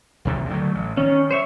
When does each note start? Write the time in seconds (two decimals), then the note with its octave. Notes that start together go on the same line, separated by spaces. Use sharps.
0.25 D#2 C3
0.49 D3 F#3 A3
0.75 A1
0.97 D#3 C#4
1.31 C5 C#5 E5